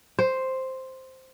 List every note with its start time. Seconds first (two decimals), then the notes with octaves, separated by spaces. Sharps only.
0.19 C5